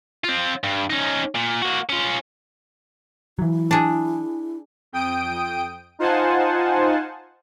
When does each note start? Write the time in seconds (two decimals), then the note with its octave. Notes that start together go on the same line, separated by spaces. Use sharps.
0.24 C4 F4
0.64 G2
0.90 C#4 D#4
1.35 A#2
1.62 A#3 F#4
1.90 C#4 F4
3.39 E3 F#3 E4
3.71 D4 G#4
4.92 F2 G5 D#6 D7
5.99 D#4 F4 C5 F#5 G#5 A5